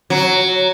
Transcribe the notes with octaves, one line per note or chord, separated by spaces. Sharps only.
F#3